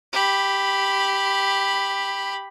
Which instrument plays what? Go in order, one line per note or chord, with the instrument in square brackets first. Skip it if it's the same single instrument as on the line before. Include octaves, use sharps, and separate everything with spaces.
[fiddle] G4 B5